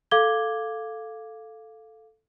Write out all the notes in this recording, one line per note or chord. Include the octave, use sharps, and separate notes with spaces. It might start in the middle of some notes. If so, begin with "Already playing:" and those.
A4 F5 D6 G#6 G7